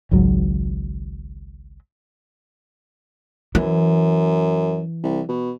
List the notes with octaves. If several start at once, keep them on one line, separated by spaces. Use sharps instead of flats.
G#1 C#2 G#2 F#3
F#2 E3
C2
B2